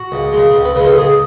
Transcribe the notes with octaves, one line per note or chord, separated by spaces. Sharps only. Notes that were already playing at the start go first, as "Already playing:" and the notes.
Already playing: F#4
C#2
G#3
C#3
C#2
B4
C#3 G#3 B4
A4
C#2 G#4